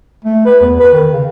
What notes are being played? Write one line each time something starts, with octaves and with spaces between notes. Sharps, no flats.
A3
B4
E2
B4
D#3
C#3